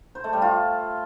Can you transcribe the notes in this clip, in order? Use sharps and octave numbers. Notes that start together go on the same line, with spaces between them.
C5
A3
G3
F4